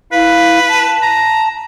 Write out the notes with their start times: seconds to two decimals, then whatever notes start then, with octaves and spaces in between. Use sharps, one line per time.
0.12 E4 B4 F5
0.68 A5
1.03 A#5